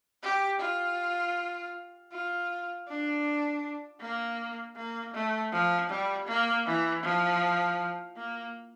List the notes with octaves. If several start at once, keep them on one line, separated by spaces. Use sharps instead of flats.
G4
F4
F4
D4
A#3
A#3
A3
F3
G3
A#3
E3
F3
A#3